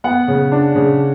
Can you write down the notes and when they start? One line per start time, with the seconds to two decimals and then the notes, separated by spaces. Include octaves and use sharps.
0.04 B3 F#5
0.28 C#3
0.52 D4
0.75 C#3